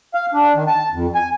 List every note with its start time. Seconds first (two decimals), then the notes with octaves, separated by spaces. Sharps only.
0.14 F5
0.33 D4
0.55 D#3
0.67 A5
0.92 F2
1.15 G#5